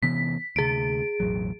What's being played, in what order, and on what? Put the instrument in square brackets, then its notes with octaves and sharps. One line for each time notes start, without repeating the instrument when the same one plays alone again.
[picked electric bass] C3 E3 B3 [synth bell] B6
[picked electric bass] D2 C3 [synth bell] G#4 D7
[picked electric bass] E1 A1 F#3